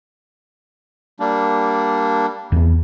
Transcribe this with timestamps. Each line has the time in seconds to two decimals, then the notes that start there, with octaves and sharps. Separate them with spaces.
1.20 G3 A#3 D4
2.52 E2 B3